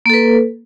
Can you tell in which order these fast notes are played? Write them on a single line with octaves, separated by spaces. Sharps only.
A#3 A4 B4